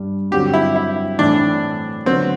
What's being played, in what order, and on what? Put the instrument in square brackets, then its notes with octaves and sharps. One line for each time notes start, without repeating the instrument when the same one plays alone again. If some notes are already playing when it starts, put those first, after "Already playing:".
Already playing: [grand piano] G2 G3 D4
[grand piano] G2 D3 F#3 C4 F#4 [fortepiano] G4
[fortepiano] E4
E4
[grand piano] A2 E3 A3 C4 [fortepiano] D4
[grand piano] D3 F#3 B3 F#4 B4 [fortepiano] C4